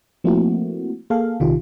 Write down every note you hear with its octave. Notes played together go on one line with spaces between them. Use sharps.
F3 A3 A#3 C4 E4 F#4
A#3 G#4 A4 F5
A#1 C3 D#3 F4 G4